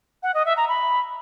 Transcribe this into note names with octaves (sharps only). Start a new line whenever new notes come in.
F#5
D#5
E5
A#5
B5